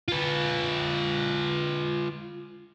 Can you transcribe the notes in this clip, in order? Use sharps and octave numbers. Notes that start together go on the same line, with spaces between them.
F4 B4